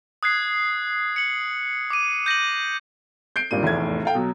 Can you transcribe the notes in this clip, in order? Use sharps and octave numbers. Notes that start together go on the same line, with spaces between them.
D#6 F#6 G#6 C7
C#7 F#7
D6 D#7
G6 A#6 D#7 F#7
G6 C7 D7
G#1 G2 A#2 D#7
F1 E2 A2 G#6
A4 F5 G5
B2 F#3